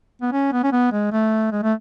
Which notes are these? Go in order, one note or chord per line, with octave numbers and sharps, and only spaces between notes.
B3
C#4
B3
C#4
B3
G#3
A3
G#3
A3